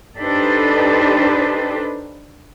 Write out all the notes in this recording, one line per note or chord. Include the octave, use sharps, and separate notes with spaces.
D4 D#4 G4 A4 B4 C5